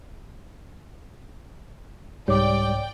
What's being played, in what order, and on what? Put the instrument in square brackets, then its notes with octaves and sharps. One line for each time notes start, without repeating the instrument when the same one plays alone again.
[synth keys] C2 G#2 [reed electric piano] G3 [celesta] C#5 D6 [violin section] D5 G5